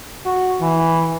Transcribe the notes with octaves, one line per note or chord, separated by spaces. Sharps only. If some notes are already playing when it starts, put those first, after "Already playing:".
F#4
E3